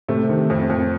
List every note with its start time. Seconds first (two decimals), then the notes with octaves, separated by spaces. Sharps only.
0.08 C3 A3
0.29 D#3
0.50 F2
0.70 F2